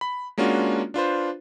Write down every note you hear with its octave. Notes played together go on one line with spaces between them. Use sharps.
B5
G#3 A#3 C#4 D4 F4 F#4
D4 F4 B4 C5